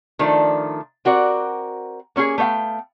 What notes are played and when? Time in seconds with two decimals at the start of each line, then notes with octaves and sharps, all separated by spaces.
0.19 D#3 F3 A3 D4
1.05 C4 F#4 A#4 D5
2.16 A#3 C#4 G4 G#4
2.38 A3 B3 C#5 F5 G5